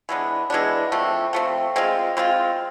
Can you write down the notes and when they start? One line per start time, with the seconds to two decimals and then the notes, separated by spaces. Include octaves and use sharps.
0.09 E3 G#3 B3 D4
0.50 E3 G#3 B3 D4
0.92 F3 A3 C4
1.33 F3 A3 C4
1.76 G#3 C4 F4
2.17 G#3 C4 F4